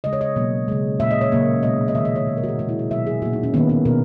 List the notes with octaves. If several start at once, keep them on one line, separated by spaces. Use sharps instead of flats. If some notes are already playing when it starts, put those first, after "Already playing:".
C#3 G#3 D#5
C#5
D#5
B2 F#3 A#3
C#3 G#3
A#2 G#3 E5
D#5
C#5
C#3 F#3 A#3
B2 G#3 D#5
D#5
D#3 G#3 E5
D#5
C#5
B2 G#3
A#4
F#4
G#4
A#2 G#3 F#4
E4
F#4
B2 F#3 A#3 E5
G#4
A#2 A#3 F#4
D#4
C#4
D#3 A#3 B3
B3
B2 A#4